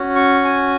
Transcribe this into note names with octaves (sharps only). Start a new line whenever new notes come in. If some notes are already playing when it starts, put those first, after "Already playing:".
Already playing: C#4 F#4
C#6
G#5